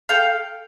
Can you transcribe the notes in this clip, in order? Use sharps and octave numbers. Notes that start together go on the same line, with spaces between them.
A4 F5 G5